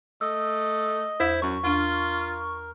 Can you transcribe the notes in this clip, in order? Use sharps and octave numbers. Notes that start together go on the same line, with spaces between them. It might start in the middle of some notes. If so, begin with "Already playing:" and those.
A3 D#5 E6
E2 E4 C5
F#2 C#6
E2 D4 F4 A#4